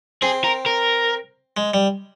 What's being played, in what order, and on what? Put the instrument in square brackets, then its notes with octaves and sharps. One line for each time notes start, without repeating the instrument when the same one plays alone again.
[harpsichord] C4 [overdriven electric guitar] G#4
[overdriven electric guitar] A#4
A#4
[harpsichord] G#3
G3